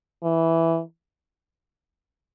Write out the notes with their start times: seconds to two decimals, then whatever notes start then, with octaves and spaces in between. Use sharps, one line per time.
0.23 E3